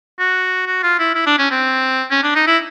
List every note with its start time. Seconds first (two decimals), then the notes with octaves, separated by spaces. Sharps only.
0.19 F#4
0.66 F#4
0.83 F4
0.99 E4
1.15 E4
1.26 D4
1.38 C#4
1.51 C4
2.11 C#4
2.23 D4
2.35 D#4
2.47 E4